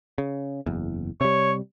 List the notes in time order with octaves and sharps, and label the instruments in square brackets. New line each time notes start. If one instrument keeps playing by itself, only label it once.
[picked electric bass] C#3
F#1 E2
[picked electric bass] C3 G3 [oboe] C#5